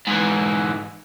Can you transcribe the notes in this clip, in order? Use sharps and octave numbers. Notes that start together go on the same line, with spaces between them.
G#2 E3